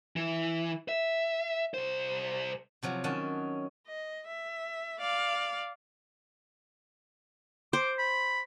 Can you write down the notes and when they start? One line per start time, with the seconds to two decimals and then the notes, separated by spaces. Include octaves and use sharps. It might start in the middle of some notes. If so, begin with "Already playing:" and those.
0.16 E3
0.89 E5
1.74 C2 C5
2.83 C3 F3 F#3
3.04 D#3 C#4 F#5 A5
3.86 D#5
4.27 E5
4.99 D5 F5
7.73 C5 D6
7.98 B5